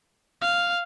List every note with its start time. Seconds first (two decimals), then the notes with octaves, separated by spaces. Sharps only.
0.42 F5